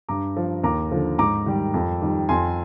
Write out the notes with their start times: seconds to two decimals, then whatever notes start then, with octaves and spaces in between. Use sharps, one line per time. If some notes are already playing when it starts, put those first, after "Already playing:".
0.09 G2 A#5 D6
0.37 F3
0.64 D#2 A#5 D6
0.91 D3 F3
1.19 G#2 A#5 D6
1.46 D#3 G3
1.74 F2
2.02 D#3 G3
2.29 F2 G#5 C6